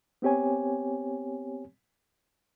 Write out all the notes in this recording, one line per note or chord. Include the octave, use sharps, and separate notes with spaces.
B3 C4 G4 C#5 G#5